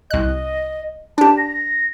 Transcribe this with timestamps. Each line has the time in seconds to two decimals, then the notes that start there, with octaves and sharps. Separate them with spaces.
0.11 C2 D#5 F#6
1.18 D4 G4 A5
1.37 A#6